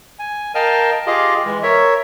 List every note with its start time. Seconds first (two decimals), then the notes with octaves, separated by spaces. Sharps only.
0.19 G#5
0.55 A#4 D#5 F5 G5 A5 F6
1.07 F4 G4 G#4 D#5 F5
1.45 E3 G#3
1.63 A#4 C#5 E5